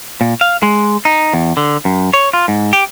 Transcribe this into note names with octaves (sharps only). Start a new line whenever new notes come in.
A#2
F5
G#3
D#4
E2
D3
F#2
C#5
F4
G#2
G4